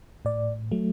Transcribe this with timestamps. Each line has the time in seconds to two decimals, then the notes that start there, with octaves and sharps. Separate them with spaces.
0.25 A2 D5
0.71 F#3 A3